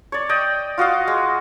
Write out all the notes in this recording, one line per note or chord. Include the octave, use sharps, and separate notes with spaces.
C#5 D5
D5 D#5 G5
F4 F#4 D#5 F5
G#3